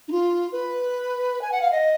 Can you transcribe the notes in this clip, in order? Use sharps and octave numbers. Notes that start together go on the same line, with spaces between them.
D#4
F4
B4
G#5
F#5
F5
D#5